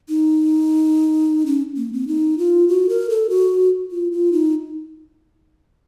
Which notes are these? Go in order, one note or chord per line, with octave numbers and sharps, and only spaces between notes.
D#4
C#4
A#3
C4
D#4
F4
F#4
A#4
A4
F#4
F4
F4
D#4